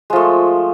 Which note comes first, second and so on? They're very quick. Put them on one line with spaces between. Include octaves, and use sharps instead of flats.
G#3 F3 A3